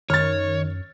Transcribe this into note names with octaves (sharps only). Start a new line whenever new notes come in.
F#2 D#3 C#5 F6 A6